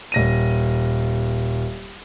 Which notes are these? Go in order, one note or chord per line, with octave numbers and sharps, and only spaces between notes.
D#1 A#6 D#7